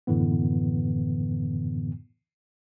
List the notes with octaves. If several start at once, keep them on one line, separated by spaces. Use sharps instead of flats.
F#2 A2 D3 E3 B3